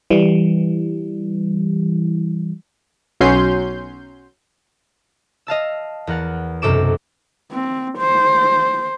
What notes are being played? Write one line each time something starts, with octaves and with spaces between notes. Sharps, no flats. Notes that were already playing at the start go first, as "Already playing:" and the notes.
E3 G3
B1 F#3 C#4 C6 G6
D#5 F5 A5 E6
E2 A#4 F#5 A6
B1 F#2 C3 A4 D6 E7
C4
C5